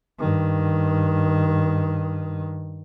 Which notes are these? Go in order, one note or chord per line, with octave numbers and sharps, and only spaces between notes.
G2 D#3